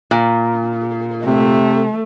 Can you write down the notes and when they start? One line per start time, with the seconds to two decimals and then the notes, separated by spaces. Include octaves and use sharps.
0.11 A#2
1.26 C3 A3